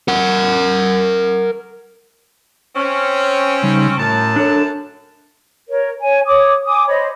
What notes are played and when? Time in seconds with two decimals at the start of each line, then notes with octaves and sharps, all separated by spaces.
0.08 A#4 F#5
2.76 C4 C#4
3.63 C#3 G3 D#4
3.98 F#2 A2 A5
4.36 D4 A4 C#5
5.69 A#4 C#5
6.01 C#5 G#5
6.26 C#5 D6 D#6
6.67 G#5 D6 D#6
6.87 C5 C#5 D#5 B5